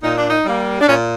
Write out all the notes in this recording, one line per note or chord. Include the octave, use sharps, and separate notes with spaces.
A#2 D#4
D4
D#4
G3 A#3
D4
A#2 C#4